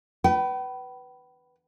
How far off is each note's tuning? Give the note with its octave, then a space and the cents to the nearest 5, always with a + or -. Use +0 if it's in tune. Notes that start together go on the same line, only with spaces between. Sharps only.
B4 +0 G5 -40